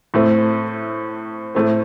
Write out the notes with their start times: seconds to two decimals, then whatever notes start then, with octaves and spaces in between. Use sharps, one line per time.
0.14 A2 A3 C4
1.55 A2 A3 C4